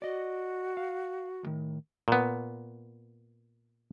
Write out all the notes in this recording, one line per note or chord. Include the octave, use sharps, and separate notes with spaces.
F#4 D5 D#5
F5
D#2 A2 D#3
A#2 B3